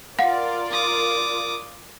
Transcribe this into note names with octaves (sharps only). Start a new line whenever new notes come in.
F4 A#4 D5 F5 F#5
D6 D#6